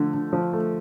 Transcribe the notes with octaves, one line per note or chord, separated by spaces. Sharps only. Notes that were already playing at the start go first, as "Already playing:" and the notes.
Already playing: D3 F3 A3
D3
F3
A3